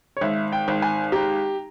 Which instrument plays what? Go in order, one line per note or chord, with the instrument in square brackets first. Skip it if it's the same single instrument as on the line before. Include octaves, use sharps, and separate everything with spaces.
[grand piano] C#5
[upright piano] G#1 [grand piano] E5
[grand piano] G5
[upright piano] G#1
[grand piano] G#5
[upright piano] G4 [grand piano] A#5